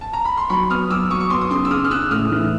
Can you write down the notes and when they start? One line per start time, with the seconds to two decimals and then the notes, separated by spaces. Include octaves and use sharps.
0.01 A5
0.13 A#5
0.25 B5
0.37 C6
0.49 F#3 B5 C#6
0.70 B3 D#6 F6
0.90 F#3 D6 E6
1.10 F#3 C#6 D#6
1.20 C#6
1.30 B3 C6 D6
1.41 D#6
1.51 C#3 C6 D6
1.65 E6
1.71 C#3 D#6 F6
1.85 F6
1.91 C#3 E6 F#6
2.11 A2 D#6 F6
2.31 E3